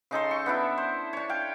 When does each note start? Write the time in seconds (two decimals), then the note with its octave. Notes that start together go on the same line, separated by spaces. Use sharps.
0.11 C#3 D#4 A4 C6
0.31 C#6
0.46 B3 D4 E4
0.78 C5
1.13 D4 C#5
1.29 F5 G5